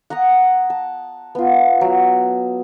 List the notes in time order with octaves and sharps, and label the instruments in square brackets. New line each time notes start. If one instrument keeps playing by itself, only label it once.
[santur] F#5 A#5 C#6 D#6
A5
B3 F4
F#3